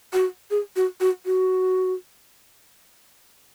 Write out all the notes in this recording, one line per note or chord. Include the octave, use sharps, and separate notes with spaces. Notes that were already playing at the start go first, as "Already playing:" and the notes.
F#4
G#4
F#4
F#4
F#4